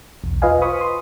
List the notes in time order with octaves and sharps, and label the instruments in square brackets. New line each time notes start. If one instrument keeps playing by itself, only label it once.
[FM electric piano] B1 E2
F4 B4 D#5 F5 G#5
B4 C5 B5 C#6 D#6
C6